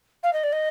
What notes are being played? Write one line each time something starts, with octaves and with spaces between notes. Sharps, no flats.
F5
D#5
D5
D#5